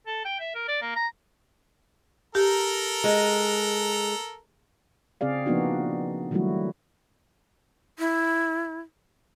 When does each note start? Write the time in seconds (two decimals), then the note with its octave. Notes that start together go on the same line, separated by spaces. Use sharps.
0.07 A4
0.25 G5
0.40 E5
0.55 A#4
0.68 D5
0.82 A#3
0.96 A#5
2.35 G4 A4 A#4 A#5
3.04 G#3
5.21 C#3 C4 G#4 D5 F5
5.46 F3 A#3 B3 D4 D#4 F#4
6.31 D#3 F#3 G3 A3 E4 F#4
7.99 E4